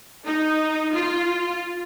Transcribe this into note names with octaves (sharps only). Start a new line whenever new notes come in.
D#4
F4